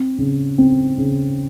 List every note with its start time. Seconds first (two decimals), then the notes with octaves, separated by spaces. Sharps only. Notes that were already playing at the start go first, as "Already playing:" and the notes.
Already playing: C4
0.18 C#3
0.58 C4
0.98 C#3